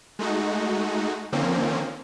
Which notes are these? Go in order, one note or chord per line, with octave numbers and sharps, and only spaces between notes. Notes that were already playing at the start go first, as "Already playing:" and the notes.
G#3 A3 D#4 F#4
D3 D#3 F3 A#3 C4 C#4